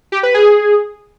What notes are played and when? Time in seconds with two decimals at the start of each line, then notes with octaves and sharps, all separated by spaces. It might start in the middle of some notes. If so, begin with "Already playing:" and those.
0.12 G4
0.23 B4
0.34 G#4